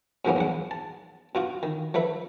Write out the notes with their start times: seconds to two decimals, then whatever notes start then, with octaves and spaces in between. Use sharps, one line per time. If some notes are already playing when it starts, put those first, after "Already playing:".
0.25 G#2 B2 F3 A#3 B3 C#4
0.36 B1 E2 F#5
0.71 A5
1.35 B2 F4 F#4
1.63 D#3
1.94 F3 A3 B4 E5